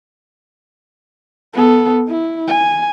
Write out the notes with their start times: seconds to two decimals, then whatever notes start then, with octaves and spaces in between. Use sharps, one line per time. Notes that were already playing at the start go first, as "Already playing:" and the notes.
1.54 B3 A4
2.08 E4
2.48 G#5